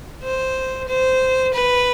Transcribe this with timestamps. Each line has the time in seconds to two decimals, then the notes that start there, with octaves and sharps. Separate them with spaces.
0.23 C5
0.88 C5
1.53 B4